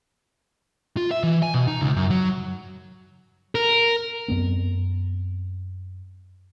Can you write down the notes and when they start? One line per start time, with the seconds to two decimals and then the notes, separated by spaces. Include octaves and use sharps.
0.97 F4
1.11 E5
1.23 E3
1.43 G#5
1.54 B2
1.68 D#4
1.82 C#2
1.96 F#2
2.10 F#3
3.55 A#4
4.28 F#2 B3 C4